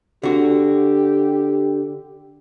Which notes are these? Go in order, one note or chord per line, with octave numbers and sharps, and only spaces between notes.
D3 F#4 G4